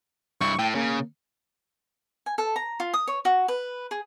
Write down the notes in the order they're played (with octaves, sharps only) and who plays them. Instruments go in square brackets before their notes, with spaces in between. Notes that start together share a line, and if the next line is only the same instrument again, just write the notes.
[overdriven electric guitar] G2 E4 [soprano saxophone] C#6
[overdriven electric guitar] A2 [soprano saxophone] G5
[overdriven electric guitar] C#3 [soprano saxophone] A#3
[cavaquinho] G#5
A4
A#5
F4
D#6
C#5
F#4
B4
G#4